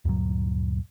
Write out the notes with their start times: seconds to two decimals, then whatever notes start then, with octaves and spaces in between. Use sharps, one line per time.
0.05 D2 G2 A#2 F#3